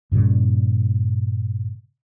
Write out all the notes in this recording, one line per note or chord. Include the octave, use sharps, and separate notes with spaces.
G2 A#2 C#3 G3